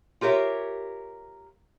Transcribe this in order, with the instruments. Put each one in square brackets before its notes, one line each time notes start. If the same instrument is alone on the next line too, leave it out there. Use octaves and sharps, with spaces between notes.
[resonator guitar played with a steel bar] F4 G4 A#4 C#5 E5